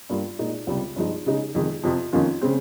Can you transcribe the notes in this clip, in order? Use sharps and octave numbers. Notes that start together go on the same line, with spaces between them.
G2 G3 A#3 F4
A#2 G#3 D#4
C#2 C3 G3
G2 F3 G#3 D#4
C#3 G#3 D#4
F2 C3 D#3 G#3
F2 C3 F3
F2 D#3 A#3 C#4 F4
C#3 G#3 C4